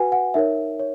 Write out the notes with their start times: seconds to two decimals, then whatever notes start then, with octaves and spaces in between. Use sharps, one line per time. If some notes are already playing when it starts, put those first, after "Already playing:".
Already playing: F#4 B4 F#5 G#5
0.12 F#5
0.34 D#4 A#4 C#5 E5
0.80 C#5